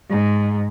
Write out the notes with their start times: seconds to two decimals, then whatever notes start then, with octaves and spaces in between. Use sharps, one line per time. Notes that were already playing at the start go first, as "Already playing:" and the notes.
0.11 G#2